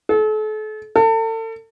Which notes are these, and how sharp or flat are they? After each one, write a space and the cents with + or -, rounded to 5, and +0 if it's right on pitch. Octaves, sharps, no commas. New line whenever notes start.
A4 -40
A4 +35